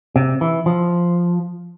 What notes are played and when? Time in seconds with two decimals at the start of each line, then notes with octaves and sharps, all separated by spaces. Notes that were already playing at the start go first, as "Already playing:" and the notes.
0.16 C3
0.41 E3
0.66 F3